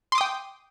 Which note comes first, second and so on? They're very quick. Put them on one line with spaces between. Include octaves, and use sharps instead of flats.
C6 D6 D#6 G5